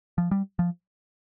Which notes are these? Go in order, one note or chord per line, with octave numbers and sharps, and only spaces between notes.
F3
G3
F3